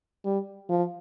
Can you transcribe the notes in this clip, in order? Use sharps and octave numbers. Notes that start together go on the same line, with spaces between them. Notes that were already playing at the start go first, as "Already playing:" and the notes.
G3
F3